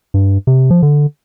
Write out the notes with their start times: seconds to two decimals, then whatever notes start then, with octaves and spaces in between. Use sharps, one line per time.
0.14 G2
0.47 C3
0.70 F3
0.82 D3